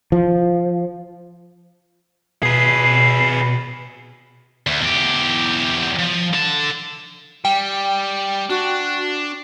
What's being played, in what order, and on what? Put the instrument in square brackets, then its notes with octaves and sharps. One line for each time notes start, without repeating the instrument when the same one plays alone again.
[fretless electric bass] F3
[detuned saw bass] B2 [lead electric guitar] G#4 B4 [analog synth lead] C7
[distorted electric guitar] D2
E2 G4
F3
D3 A5
[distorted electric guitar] G3 [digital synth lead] G5
[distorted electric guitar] D4 [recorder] F#4